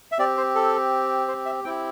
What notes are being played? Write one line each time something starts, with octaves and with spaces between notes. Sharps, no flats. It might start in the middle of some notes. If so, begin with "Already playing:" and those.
E5
C4 G4 D5
C5
A4
C5
E5
C4 E4 G4 G5